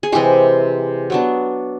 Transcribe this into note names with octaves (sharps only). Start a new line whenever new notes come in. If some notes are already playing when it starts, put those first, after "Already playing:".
G#4
C3 E3 G#3 G4
F#3 B3 D4